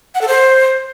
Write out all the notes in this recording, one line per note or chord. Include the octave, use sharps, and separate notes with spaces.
F#5
A4
C5